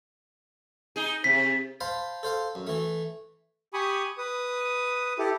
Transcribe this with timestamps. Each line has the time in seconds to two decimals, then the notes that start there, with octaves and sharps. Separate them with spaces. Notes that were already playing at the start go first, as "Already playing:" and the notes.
0.96 D#4 G#4
1.24 C3 B6
1.81 C5 F5 A5 B5
2.23 A4 C5 F5
2.55 F#2
2.67 E3 A3
3.73 G4 G#5 B5 C#6 D#6
4.18 B4 D#6
5.18 E4 G4 A4